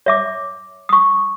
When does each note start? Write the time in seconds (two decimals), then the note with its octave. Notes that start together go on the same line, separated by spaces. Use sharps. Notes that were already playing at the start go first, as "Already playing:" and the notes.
0.06 C#5 E5 D6
0.89 C#6 D#6